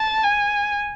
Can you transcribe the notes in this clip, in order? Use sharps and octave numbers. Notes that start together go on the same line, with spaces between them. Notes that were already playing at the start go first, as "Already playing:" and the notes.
Already playing: A5
G#5